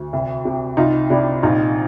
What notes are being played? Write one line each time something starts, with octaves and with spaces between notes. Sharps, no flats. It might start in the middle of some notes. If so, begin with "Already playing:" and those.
Already playing: D2
C2
C3
C2 D#4 F4
C3 D4 E4
A#1 D#4 F4